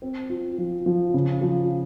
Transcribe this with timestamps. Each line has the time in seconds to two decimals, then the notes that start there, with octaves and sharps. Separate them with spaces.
0.02 C4
0.30 F4
0.58 F3
0.86 F3
1.14 C#3
1.42 F3